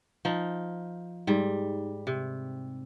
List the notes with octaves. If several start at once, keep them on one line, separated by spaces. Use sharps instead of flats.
F3 D#4
G#2 G3
C3